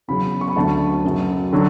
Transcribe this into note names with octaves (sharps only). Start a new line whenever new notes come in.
E2 C#3 F#3 B5
C#6
B5
D2 D3 F#3 A5
F#2 C#3 F#3
D3 F#3